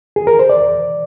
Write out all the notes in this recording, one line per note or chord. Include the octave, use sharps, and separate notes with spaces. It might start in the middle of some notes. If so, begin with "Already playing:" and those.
G#4
A#4
C5
D5